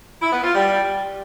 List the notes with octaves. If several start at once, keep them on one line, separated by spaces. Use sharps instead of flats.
E4
B3
F4
G3